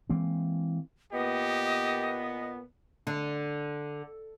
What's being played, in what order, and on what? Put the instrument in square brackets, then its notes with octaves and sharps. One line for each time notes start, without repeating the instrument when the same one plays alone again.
[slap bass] E3 G#3 A#3 C4
[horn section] A#2 B3 [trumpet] G4 [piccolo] D#5
[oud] D3